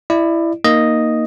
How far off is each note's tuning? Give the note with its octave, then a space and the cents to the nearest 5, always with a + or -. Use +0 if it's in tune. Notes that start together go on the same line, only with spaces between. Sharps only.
E4 +10 D5 +30
A#3 +0 D#4 +0 D#5 +0